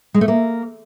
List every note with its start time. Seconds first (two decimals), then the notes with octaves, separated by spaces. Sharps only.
0.14 G#3
0.21 A3
0.28 A#3